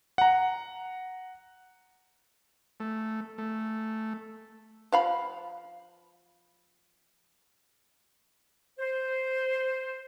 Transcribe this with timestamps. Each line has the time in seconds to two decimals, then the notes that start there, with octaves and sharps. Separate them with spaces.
0.18 F#5 A#5
2.80 A3
3.38 A3
4.92 F3 F5 B5
8.79 C5